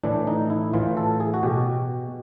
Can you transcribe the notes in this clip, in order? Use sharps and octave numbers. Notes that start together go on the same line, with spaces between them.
A2 E3 D4
D#4
E4
A2 E3 F4
A4
G#4
F#4
B2 G4